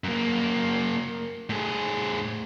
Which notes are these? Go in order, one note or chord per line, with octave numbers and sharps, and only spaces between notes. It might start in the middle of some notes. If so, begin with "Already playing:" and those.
F#2 A#3
A2 G#4